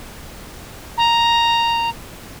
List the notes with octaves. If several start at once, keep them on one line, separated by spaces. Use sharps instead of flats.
A#5